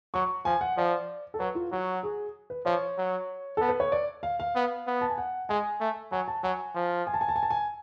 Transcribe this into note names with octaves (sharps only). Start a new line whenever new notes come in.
F#3 C#6
F3 G#5
F#5
F3 D5
A4
F#3 B4
F4
F#3 F#4
G#4
B4
F3 C#5
F#3
B3 A4
B4
C#5
D5
F5
F5
B3
B3
A5
G#5
F#5
G#3 G#5
A3
F#3 G#5
A5
F#3 G#5
F3
G#5
A5
G#5
A5
G#5
A5
G#5